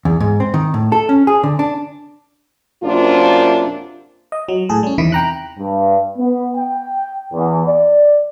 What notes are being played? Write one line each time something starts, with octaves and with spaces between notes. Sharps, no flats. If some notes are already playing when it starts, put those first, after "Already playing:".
E2
G#2
C4
D#3
A2
A4
C#4
G#4
D3
D4
F#2 C3 A#3 D4 F4
D#5
F#3
A2 G#4 A4
G3 C#4
E2 C3 D#3 E4 B6
G5 A#5 F#6
G2
B3
G5
E2
D5